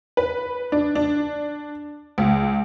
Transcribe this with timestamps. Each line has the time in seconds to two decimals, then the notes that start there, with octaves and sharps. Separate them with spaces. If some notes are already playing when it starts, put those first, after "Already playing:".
0.17 B4
0.72 D4
0.95 D4
2.18 C#2